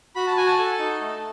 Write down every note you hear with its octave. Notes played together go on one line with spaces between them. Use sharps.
F#4 B5
A5
F#4 G#5
A5
A4
D#4
A3